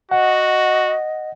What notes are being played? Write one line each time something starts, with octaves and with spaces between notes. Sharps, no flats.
F#4 D#5 F#5